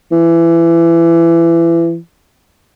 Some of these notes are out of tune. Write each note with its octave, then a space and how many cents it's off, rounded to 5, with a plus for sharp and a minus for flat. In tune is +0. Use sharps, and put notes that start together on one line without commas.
E3 +25